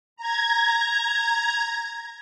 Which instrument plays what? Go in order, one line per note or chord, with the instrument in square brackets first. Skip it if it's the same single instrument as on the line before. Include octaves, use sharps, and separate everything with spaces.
[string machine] A#5 G#6